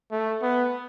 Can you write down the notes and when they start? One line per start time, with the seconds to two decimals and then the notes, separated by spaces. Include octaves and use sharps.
0.11 A3
0.42 B3